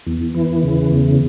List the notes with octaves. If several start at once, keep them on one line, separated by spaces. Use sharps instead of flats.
E2
E3
C#3
E2